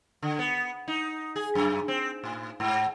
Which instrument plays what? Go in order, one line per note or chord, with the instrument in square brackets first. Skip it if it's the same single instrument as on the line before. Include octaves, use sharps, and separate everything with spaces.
[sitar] D3
B3
D#4
G#4
F#2
C4
A2
G#2